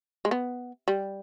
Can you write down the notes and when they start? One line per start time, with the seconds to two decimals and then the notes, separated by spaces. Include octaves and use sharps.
0.25 G#3
0.31 B3
0.88 G3